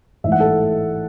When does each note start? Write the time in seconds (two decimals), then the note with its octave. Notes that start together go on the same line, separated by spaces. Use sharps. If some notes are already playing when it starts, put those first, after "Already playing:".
0.24 A1 G#2 E3 E5
0.32 F#5
0.40 A4